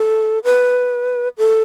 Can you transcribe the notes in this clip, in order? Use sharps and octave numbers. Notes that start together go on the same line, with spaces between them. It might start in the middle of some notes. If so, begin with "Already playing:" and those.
Already playing: A4
B4
A4